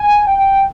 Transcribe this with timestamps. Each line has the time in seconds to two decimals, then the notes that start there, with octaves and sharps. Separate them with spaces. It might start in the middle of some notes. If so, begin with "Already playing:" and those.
Already playing: G#5
0.27 G5